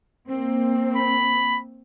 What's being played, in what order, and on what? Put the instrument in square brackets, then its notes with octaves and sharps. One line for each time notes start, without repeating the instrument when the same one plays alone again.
[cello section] A#3 C4
[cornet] B5